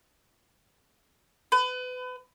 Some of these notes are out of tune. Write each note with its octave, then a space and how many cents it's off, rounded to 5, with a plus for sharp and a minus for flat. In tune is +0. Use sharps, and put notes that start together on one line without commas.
B4 +30